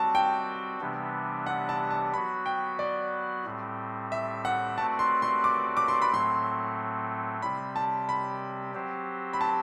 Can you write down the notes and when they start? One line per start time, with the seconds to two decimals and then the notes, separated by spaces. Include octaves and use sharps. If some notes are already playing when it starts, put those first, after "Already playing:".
Already playing: G3 C4 F#4 A5
0.15 G5
0.80 C3 E3 G3 B3 D4
1.46 F#5
1.69 A5
1.91 A5
2.12 F#3 B3 F#4 B5
2.46 G5
2.79 D5
3.45 A2 G3 C4
4.12 E5
4.45 F#5
4.77 A3 C4 F#4 B4 D5 A5
4.99 C6
5.22 C6
5.44 D6
5.77 D6
5.88 C6
6.02 B5
6.10 A2 F#3 A3 C4 C6
7.42 C3 G3 C4 B5
7.76 A5
8.09 B5
8.74 F#3 C4 G4 C5
9.33 B5
9.41 A5